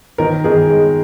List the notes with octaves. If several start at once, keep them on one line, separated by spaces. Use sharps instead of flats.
D#3 A#4
D#3 G#4
G#3